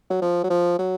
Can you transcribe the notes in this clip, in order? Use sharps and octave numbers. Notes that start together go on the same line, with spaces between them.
F#3
F3
F#3
F3
F#3